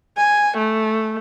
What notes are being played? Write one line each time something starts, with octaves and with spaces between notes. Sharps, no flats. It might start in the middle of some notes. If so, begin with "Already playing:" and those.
G#5
A3